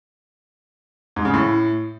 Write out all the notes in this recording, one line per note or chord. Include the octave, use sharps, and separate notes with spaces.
G#2
C#3
A2